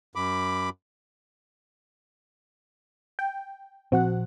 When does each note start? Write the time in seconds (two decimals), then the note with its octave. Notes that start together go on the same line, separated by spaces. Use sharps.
0.16 F#2 B5 D6
3.19 G5
3.92 A#2 F3 C4 F#4 F#5